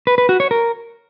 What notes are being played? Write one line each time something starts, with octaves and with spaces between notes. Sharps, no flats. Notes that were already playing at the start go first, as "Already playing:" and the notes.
B4
B4
F#4
C#5
A#4